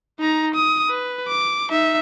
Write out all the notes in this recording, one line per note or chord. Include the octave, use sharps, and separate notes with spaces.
D#4 A#5
D#6
B4
D6
D#4 E5